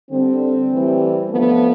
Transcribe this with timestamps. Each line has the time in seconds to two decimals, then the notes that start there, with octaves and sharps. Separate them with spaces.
0.11 D3 G3 C4
0.71 A2 E3 G3
1.30 D3 F3 A3 B3